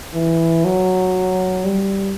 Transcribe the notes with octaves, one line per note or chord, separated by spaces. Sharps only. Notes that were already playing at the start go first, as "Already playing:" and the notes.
E3
F#3
G3